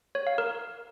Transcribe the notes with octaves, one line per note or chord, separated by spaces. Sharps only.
C#5
F5
A#4